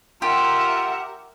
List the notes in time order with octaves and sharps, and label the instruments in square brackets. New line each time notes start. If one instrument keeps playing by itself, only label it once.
[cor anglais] F4 [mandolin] G4 [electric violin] A#4 E5 [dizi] F#5